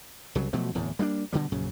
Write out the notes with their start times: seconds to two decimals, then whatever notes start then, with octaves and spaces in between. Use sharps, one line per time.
0.35 C2 C#3 F#3
0.53 B2 F3 F#3 A3
0.75 D1 E2 A2
0.99 G3 A#3 C4 D4
1.33 B2 D3 F#3 G3
1.52 A#1 F#2 C#3